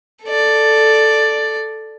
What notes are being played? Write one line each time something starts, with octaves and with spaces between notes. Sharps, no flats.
A4 D5